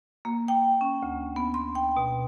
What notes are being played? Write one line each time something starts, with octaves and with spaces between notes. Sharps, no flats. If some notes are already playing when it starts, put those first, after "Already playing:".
A#3
G5
C#4
D2
B3
C6
G5
B2